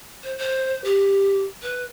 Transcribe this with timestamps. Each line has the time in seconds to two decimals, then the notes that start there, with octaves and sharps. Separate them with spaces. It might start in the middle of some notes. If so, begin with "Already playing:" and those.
0.24 C5
0.38 C5
0.84 G4
1.63 B4